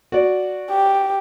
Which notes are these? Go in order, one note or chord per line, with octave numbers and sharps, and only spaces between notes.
F#4 D5
G4